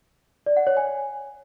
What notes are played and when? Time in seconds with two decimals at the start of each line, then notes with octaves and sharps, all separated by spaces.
0.46 D5
0.57 F#5
0.67 C#5
0.77 G#5